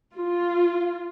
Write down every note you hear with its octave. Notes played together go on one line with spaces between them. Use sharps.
F4